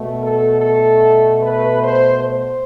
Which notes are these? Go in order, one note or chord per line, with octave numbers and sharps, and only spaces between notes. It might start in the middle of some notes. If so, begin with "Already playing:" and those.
Already playing: B2 A3
A4
A4
B4
C5
C5